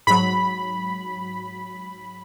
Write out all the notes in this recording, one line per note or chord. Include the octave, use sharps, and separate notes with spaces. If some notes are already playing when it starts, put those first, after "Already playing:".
G#2 F#3 B5